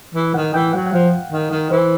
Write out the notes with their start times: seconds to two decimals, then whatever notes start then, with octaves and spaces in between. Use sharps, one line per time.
0.14 E3
0.34 D#3 F#5
0.54 E3 G5
0.73 F#3 F#5
0.86 F#5
0.93 F3 F5
1.32 D#3
1.51 D#3
1.71 E3 C5